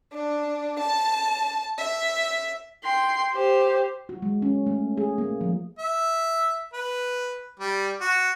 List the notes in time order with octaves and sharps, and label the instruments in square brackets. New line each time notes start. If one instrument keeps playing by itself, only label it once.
[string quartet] D4
A5
E5
[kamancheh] G5 C6
G4 C5
[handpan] F#4
G#3
C#4
A3
G#4
A#3
F3
[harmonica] E5
B4
G3
F#4